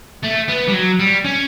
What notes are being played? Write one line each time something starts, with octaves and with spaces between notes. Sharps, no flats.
A3
B3
G3
F#3
G3
C#4